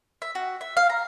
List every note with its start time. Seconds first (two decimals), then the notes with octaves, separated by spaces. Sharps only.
0.22 E5
0.35 F#4
0.61 E5
0.77 F5
0.90 A#5